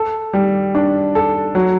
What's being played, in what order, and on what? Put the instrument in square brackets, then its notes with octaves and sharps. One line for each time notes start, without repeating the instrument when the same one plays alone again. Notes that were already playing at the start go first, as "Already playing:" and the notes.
Already playing: [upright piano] A4
G3
D4
A4
F#3